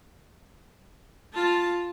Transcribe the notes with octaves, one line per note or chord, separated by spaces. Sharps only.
F4 A5